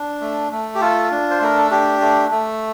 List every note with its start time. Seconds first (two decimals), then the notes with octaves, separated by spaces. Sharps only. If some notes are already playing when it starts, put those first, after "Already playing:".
Already playing: D4
0.21 A3
0.52 A3
0.75 G4
0.81 F4 A4
1.11 D4
1.30 C5
1.41 A3 A#4
1.57 A4
1.71 D4 G4
2.01 A3
2.32 A3